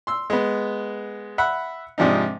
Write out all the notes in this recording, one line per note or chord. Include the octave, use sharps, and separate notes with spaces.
C6 E6
G#3 B3
E5 F#5 B5
G#2 C3 F3 D4 D#4